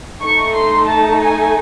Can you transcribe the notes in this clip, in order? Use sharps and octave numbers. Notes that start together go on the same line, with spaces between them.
A3 D#4 A4 C#6
C6
A5
G#5